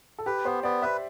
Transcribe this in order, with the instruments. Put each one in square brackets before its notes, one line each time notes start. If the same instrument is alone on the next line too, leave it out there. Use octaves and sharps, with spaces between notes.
[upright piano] A4
[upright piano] G4 [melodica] B4
[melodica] B3 [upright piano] C5
[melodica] B3 [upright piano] D5
[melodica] B4 [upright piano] E5